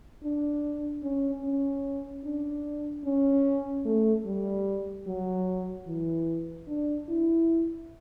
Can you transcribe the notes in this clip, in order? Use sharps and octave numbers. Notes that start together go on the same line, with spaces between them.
D4
C#4
C#4
D4
C#4
A3
G3
F#3
E3
D4
E4